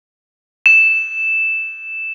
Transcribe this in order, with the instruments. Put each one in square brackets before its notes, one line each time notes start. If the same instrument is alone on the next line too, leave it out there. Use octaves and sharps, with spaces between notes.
[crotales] E7